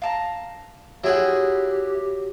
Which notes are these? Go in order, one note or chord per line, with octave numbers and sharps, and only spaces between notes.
F5 A5 A#5
F#3 E4 G4 G#4 F#5 G5 C6